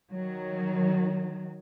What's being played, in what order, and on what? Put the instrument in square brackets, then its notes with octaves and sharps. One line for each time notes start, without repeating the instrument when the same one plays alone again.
[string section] D#3 F#3